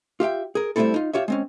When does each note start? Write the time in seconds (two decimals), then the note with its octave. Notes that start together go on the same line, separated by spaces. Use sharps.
0.20 F4 G4 E5 G5
0.55 G#4 A#4
0.76 G3 A3 A#3 C4 E4 A4
0.94 D#4 F4
1.13 F4 G4 C#5 E5
1.28 G#3 C4 C#4